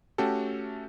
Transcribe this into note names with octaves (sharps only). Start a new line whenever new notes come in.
A3 C#4 F#4 G4 A4